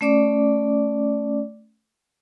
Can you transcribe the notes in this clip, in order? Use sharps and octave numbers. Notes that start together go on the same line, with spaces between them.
A3 C#4 D5 D6